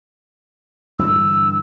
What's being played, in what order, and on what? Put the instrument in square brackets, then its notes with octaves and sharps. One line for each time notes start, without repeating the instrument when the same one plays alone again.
[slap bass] G2 D3 E3 [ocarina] E6